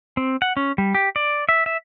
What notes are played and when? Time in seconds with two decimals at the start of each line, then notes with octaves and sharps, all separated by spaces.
0.17 C4
0.42 F#5
0.57 C#4
0.78 G3
0.94 G4
1.16 D5
1.49 E5
1.66 E5